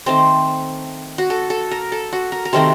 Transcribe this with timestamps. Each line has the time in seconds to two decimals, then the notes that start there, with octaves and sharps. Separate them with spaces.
0.06 D#3 A3 C4 C5
1.18 F#4
1.30 A4
1.50 A4
1.71 A#4
1.92 A4
2.13 F#4
2.32 A#4
2.45 A#4
2.53 C3 D#3 A3 C4 C5